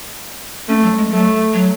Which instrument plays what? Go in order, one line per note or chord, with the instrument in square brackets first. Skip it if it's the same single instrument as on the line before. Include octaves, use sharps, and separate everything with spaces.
[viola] A3 [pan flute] C#4
[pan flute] F#3
G#3
[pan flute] F#3 [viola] A3
[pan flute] F#3